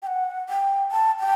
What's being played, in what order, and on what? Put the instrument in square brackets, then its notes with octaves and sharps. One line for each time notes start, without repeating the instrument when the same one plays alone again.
[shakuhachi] G5
F#5
G5
A5
G5